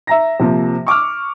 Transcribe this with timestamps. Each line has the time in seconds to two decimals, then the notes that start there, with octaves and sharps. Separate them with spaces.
0.07 E5 A#5 A#6
0.39 C3 F3 A#3
0.87 C#6 D6 E6 F6